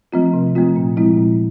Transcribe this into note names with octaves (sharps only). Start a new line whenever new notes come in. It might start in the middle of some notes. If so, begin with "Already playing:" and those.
F3 A3 C4 F4
C3
F3 A3 C4 F4
A#2
F3 G#3 C4 E4
A#2